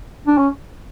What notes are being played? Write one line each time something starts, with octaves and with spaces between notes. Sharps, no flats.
D4
C#4